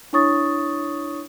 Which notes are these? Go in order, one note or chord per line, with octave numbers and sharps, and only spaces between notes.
D4 E4 C#5 C#6 D#6 A6